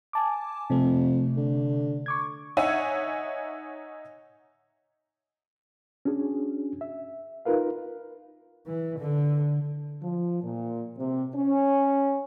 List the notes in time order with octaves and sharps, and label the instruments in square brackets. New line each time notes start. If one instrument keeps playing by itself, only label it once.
[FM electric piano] G#5 A5 D6
[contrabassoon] F2 [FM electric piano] C3 A3
[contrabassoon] D3
[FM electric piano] C#6 D6 G#6
[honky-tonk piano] D#4 C#5 E5 F#5 G#5
[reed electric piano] C#4 D4 F#4 G#4
E5
D#4 F4 A#4 B4 F5
[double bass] E3
D3
[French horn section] F3
A#2
C3
C#4